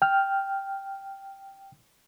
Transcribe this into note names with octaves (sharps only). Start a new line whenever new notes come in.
G5 F6